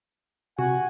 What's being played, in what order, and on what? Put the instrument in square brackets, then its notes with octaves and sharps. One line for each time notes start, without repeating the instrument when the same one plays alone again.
[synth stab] C3 F#4 [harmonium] F#5 G#5